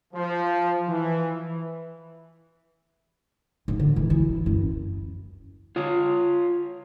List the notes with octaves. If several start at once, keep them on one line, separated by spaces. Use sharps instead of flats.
F3
E3
G#2
D3
E3
E4
F#2
F4 C#5